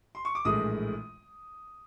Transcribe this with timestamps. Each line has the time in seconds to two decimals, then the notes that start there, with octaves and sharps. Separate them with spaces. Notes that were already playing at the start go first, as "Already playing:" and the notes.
0.15 C6
0.25 C#6
0.35 D6
0.45 A#1 A2 E3 G#3 D#6